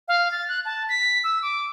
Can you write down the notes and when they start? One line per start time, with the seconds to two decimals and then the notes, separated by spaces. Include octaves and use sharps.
0.08 F5
0.32 A6
0.49 F#6
0.65 A5
0.89 B6
1.24 E6
1.42 D6